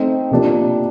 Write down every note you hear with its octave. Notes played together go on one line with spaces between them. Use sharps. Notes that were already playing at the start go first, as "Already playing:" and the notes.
Already playing: A3 C4 D#4
C3 F3 A#3 D4